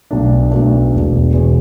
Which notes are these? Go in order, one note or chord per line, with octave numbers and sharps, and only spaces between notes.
B1 B2 A3 D4
B1 B2 A3 D4
E1 E2 B2
E1 E2 B2